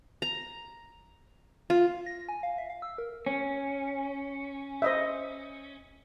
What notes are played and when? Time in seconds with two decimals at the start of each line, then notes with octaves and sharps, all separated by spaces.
0.22 A#5
1.70 F4
2.06 A#6
2.29 G#5
2.43 F5
2.58 E5
2.70 F5
2.82 E6
2.98 A#4
3.26 C#4
4.82 C5 D#5 E5